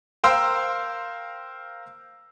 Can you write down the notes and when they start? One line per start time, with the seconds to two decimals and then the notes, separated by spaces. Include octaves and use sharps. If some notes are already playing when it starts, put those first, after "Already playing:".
0.24 A#4 C5 F5 G5 C6 E6